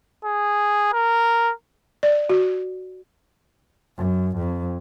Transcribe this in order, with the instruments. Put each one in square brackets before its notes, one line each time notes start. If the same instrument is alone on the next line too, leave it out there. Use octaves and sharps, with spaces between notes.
[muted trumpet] G#4
A#4
[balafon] D5
F#4
[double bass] F#2
F2